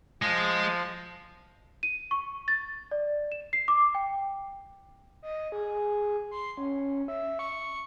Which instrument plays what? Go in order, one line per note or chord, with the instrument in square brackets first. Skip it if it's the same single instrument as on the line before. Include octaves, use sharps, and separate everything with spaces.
[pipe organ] F3 [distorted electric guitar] G#3
[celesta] D#7
C#6
A6
D5
E7
C7
D6
G5
[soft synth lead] D#5
G#4
C6
C#4
E5
C#6